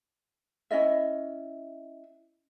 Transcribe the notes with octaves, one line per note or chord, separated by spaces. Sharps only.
C#4 E4 D#5 E5